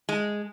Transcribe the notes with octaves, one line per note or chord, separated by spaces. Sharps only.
G#3